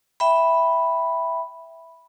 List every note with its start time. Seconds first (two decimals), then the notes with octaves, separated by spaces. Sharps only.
0.20 E5 G5 B5